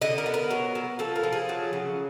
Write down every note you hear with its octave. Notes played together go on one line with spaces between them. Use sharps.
D3 D#5
A#4
B3
A#4
F#3
F#3
F3 A4
A#4
F3
G#4
F#3
C#3